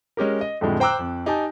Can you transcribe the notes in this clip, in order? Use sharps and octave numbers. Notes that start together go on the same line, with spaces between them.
G#3 C#4 G4 A#4
D#5
F2 A2 D3 F3 G3 G#3
C5 G5 A#5 D6 E6 F#6
F2
D#4 G4 G#5 A5